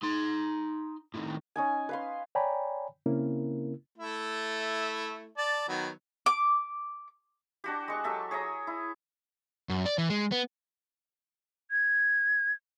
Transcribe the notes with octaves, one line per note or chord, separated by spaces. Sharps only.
D#4 C6
A2 D#3
C#4 D#4 G#5
B4 F5 C6
C#5 D5 G5 G#5 A#5 B5
C#3 A#3 C4 C#4 E4 A#4
A3 E4
D5 A5
D#3 F#3 B3
D6
D4 F#4 G4
G#3 C#6
F#3 G4 A4 E5
G#4 C#5 E5 A#5
E4
F#2
D5
E3
G#3
B3
G#6